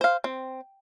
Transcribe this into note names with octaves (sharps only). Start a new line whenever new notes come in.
C5 F5
C4